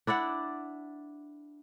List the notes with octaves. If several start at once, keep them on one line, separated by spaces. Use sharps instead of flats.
D4 E4 D5 F#5